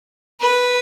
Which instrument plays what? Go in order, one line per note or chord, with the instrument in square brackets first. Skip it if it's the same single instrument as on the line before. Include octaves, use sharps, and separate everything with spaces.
[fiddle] B4